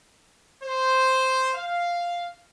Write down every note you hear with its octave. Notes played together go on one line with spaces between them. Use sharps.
C5
F5